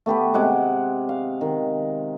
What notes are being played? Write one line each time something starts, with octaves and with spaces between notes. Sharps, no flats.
A3 B3 G4 B4
C3 G#3 F#5 D6
F5
D#3